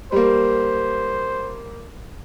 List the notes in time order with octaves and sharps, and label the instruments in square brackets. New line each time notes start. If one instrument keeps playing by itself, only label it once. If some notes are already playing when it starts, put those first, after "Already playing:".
[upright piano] G3 A#3 [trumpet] C5